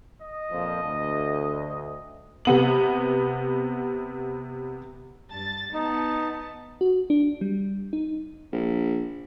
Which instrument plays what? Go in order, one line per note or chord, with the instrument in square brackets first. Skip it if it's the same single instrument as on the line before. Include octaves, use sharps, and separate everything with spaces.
[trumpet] D#5
[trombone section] F2 A#2 F3
D2
[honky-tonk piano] C3 B3 F#7
[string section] G2 A6 [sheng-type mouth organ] A5
[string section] B3 A5 [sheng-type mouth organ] D#4
[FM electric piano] F#4
D4
G3
D#4
[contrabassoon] A#1